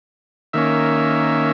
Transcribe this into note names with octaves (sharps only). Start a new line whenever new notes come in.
D#3 A#3 C#4 E5